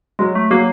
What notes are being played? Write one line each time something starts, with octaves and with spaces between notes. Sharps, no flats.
F#3 G#3
A3
F#3 A#3